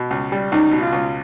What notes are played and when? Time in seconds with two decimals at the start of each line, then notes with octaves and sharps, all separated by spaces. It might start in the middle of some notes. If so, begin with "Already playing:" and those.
Already playing: B2
0.11 C#2
0.32 G3
0.52 C#2 D#4
0.71 B2
0.82 F4
0.92 C#2